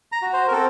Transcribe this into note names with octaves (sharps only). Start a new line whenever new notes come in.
A#5
F#4
C5
A#4
C4 A4